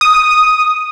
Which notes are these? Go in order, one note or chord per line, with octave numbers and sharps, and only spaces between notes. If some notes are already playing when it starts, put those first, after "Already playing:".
D#6